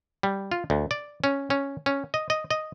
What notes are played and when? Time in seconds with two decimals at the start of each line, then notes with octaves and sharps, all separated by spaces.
0.23 G3
0.52 F4
0.70 D2
0.91 D5
1.24 C#4
1.50 C#4
1.86 C#4
2.14 D#5
2.30 D#5
2.50 D#5